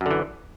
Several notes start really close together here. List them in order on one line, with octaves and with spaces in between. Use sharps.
F#2 D3 E3